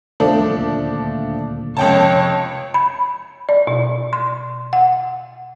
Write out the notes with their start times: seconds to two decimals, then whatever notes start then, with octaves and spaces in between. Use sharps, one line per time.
0.20 D#1 G#1 D2 F3 A3 D4
1.77 F1 C#2 C#5 G5 A5
2.74 B5
3.49 D5
3.67 B2
4.13 C6
4.73 F#5